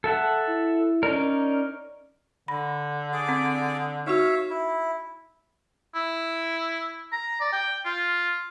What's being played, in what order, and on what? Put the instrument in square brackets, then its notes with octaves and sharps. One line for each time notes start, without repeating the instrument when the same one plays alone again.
[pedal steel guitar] A4 E5 F#5
[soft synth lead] E4
[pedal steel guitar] C#4 D#4 A#4 [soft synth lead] D5
[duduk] D3 [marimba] B5 A#6
[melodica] G#4 D5 D6
[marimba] C4 G#6
[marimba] D#4 F#4 [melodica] C#5 E5 F5
[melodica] E4
[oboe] E4
A#5
D5
G5
F4